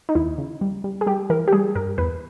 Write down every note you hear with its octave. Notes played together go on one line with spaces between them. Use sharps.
D#4
D#2 E4
C#3
G3
G3
G#4
G3 G4
E3 A#4
G4
G3 G#4
G2 A#4
E2 B4